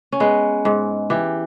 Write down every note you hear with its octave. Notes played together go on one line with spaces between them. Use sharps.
C#4
G#3 B3
G#2
E3 G4